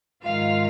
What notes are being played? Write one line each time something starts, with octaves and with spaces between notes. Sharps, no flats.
G#2 D#3 G#3 F4 F5